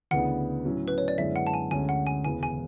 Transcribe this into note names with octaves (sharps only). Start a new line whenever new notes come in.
D2 C#3 E3 B3 D4 F#5
A2 F#3 C#4 E4
B4
C#5
D5
F#2 D3 G#3 B3 E4 E5
F#5
A5
G#5
D2 D3 G#3 C#4 G#5
F#5
G#5
E1 E2 C#3 E3 B3 G#5
G#5